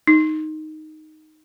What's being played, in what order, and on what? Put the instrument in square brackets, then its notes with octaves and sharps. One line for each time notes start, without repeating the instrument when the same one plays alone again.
[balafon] D#4